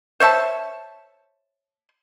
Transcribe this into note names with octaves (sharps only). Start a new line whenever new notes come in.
C5 C#5 E5 A5